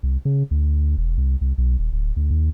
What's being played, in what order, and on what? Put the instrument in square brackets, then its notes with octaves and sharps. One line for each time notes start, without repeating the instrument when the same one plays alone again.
[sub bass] C2
C#3
D2
E1
C2
C2
B1
D#1
D1
D2
D#2